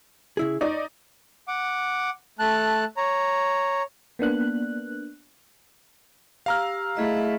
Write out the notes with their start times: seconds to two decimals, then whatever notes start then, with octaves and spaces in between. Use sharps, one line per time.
0.37 C#3 E4 G#4
0.61 D#4 C#5 D5
1.48 F#5 D6
2.39 A3 A5 F#6
2.97 C#5 A#5
4.19 A#3 B3 D4 F#6
6.46 G4 F5 A#5 E6 F6
6.97 A3 E4 G#4 D#5